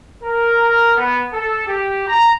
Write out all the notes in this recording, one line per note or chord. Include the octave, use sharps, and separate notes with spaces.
A#4
B3
A4
G4
A#5